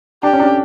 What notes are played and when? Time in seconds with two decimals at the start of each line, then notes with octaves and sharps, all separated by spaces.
0.23 D4 G4
0.33 C#4
0.40 D4
0.43 C#4